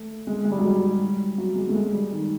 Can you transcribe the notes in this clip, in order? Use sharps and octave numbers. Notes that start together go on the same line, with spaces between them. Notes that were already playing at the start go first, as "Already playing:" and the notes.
Already playing: A3
G#3
G#3
G3
F#3
G3
F#3
G#3
A3
G#3
G3
D#3